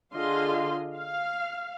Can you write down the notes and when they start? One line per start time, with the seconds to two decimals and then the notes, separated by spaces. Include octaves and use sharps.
0.14 D3 F4 G#4 D#5 F5 C6
0.97 F5